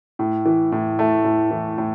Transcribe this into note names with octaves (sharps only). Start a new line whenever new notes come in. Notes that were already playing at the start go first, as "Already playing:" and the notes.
A2
E3
A2
A3
A2
E3
A2